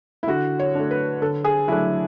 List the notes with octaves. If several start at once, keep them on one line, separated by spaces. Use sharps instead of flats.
E4
D3 F#4
C#5
A3 D4
B4
D3 A4
G#4
F#3 A3 D4 E4